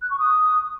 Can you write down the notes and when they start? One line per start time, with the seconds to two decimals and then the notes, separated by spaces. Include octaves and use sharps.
0.02 F#6
0.10 C#6
0.18 D#6